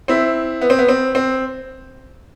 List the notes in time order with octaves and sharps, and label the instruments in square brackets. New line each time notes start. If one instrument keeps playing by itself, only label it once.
[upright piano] C4 E4
B3
C4
B3
C4
C4